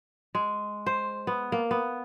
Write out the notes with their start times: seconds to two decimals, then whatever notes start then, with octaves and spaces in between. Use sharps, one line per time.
0.35 G#3
0.86 C5
1.27 B3
1.52 A#3
1.71 B3